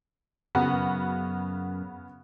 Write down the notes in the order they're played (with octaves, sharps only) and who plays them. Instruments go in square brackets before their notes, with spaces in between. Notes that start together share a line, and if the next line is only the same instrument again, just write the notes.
[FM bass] F#2 [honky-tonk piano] C#3 B3 F#4